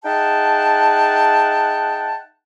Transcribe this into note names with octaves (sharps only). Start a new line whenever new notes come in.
D#4 G#4 E5 F#5 G5 A5